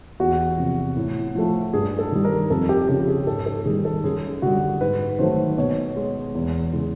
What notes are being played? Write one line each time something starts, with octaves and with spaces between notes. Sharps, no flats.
E2 F#4
C3 F3
A2
F3 A3
G2 G#4
A4
D#3 G3
A#4
F2 A4
G4
C#3 F3 G4
G#4
G#2 A4
A4
D#3 G3 G#4
A4
F#2 G#4
D3 G3 F#4
G#2 B4
D#3 F#3 A3 C5
B2 C#5
G#3
E2
C#3 E3 G#3